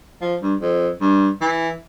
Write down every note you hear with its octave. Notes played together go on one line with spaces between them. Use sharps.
F3
G2
F2
G2
E3